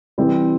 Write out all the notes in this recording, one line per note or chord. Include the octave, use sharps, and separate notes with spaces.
C3 E3 G3 C4